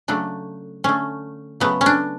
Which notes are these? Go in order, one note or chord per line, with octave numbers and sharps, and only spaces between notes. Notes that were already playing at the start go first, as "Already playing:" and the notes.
C#3 F#3 A3 D4
D3 A3 C#4
C#3 F#3 A3 B3
C#4
D4